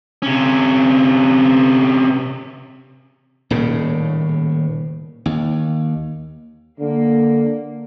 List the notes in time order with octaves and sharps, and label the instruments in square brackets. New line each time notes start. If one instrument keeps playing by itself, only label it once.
[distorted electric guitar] C3 C#4
[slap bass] D#1 D#2 A2 C#3
D#2
[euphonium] D3 [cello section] A#3